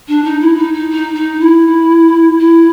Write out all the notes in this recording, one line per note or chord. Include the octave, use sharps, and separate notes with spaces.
D4
D#4
E4
D#4
D#4
D#4
D#4
E4
E4